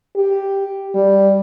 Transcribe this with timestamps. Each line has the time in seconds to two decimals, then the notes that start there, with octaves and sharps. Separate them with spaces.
0.16 G4
0.95 G3